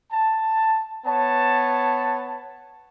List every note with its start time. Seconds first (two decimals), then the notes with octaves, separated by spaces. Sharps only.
0.12 A5
1.06 B3 B4 C#5 A5